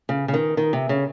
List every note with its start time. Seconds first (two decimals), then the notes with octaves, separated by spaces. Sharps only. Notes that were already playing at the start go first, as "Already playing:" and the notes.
0.09 C#3
0.28 C#3
0.34 D#3
0.57 D#3
0.73 C3
0.89 C#3